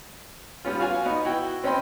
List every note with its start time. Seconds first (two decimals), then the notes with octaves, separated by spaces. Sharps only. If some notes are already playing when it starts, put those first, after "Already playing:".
0.65 G3 B3 C#4 F4
0.80 F4 F#4 F5 G#5
1.06 B3 D#4
1.25 E4 F#4 G5
1.63 C4 C#4 D#5 G5 B5 C6